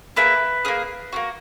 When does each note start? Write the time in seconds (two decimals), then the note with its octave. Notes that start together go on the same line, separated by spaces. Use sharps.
0.16 A#3 E4 G#4 B4
0.65 A#3 C#4 G#4
1.13 A#3 C#4 F#4